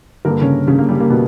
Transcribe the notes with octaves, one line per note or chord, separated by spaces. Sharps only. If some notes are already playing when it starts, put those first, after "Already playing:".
G2 D3 A#3 A#4
C#3 C#4
C#3 C#4
A#3
G3
A#3
B2 B3